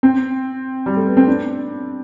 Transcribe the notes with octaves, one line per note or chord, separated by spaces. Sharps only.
C4
G3
A3
B3
C4
D4